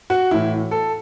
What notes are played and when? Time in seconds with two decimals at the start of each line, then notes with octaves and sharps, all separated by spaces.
0.10 F#4
0.31 A2 E3 E4
0.71 A4